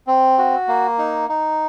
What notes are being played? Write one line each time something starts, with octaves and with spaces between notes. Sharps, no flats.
C4
F#4
A#3
D#4
D#4